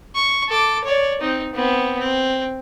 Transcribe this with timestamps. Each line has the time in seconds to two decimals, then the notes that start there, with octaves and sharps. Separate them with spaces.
0.15 C#6
0.49 A4 D6
0.84 C#5 D5
1.21 C4 D#4
1.54 B3 C4
1.99 C4